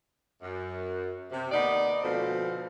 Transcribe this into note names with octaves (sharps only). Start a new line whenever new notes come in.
F#2
C3
D#2 B3 D#4 D5
D2 B2 F3 C4 A4